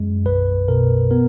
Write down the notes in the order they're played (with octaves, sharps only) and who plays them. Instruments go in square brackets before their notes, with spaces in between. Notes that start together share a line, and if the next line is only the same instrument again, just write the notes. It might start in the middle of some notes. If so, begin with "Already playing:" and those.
Already playing: [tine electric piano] F#2 G#3
B1 B4
B2 A#4
B3 A#4